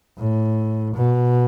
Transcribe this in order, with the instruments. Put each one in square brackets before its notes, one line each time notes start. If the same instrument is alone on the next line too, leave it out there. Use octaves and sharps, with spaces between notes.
[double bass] A2
B2